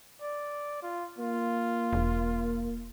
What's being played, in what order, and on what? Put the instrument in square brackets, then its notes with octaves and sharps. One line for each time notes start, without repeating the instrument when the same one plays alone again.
[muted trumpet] D5
F4
[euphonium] A#3 [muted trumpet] F4
[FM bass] E1